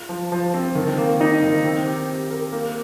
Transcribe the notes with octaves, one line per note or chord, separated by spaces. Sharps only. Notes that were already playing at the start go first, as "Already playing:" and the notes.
Already playing: F4
F3
F3
C4
D#3
A#3
D#4
D#3
C4
G4
G4
A#4
A#3